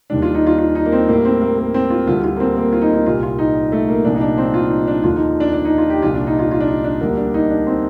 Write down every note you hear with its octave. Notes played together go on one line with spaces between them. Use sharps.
D#2 D#3 G3 D4
F4
D#4
F4
F4
D#4
A#3
C4
A2 G3 A#3
C4
A#3
A#3
C4
F4
D2 D3 G3 F4
F4
A#3
C4
A#3
F4
D#4
D#4
C2 A#2 G3 F4
F4
D#4
A3
A#3
C2 A#2 F3 D4
D#4
D4
C4
F4
D#4
D4
D#2 D3 F3 F4
D#4
D4
D4
D#4
F4
G4
C2 A#2 F3 F4
D4
D#4
F4
F4
D4
D#4
D4
D2 D3 G3 A#3
D4
D#4
D4
C4